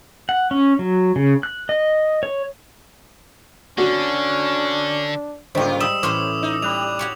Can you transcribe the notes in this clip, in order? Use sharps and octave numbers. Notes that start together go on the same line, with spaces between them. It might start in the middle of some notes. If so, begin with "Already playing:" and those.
F#5
C#4
F#3
C#3
F#6
D#5
C#5
D3 C#4 D4 F#4
G#2 C#3 G3 A#3 F4 C5 D#5 G5
G3 D#6 E6 E7
A2 E3 C#4 E4 C5 D6
D#4
G3 B5 F#6 D#7 F7
F#4 G4 C#5